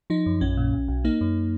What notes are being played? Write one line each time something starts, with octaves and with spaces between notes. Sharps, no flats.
F3 D#4
F#2
A#1 C#4
A#2
B1
B1
A#3 D#4
F#2